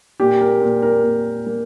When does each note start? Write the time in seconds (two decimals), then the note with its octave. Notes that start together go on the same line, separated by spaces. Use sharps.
0.20 A#2 G4
0.41 A#4
0.62 A#2
0.82 A#4
1.03 A#2
1.46 A#3